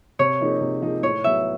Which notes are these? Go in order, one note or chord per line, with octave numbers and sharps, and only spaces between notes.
C3 C#5
F3 A#3 D#4 G#4
C3
F3 A#3 D#4 G#4
A2 C#5
F#3 B3 E5